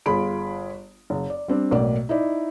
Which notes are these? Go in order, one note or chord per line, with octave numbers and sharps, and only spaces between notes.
G1 F4 G#4 B5 D7
F#1
D5
G3 C4 D4
B1 A2 A#3 D5
D#4 E4 D5